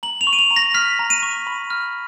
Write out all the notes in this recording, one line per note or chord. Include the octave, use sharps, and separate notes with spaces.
A#5 F#7
F7
C#6
D#7
F7
A#5
A#6
F6 B6
A#5
D#7
C#6
B5
F6